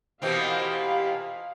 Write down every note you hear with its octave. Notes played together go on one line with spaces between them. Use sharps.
B2 E3 C4 F4 G4 A#4 F5 B5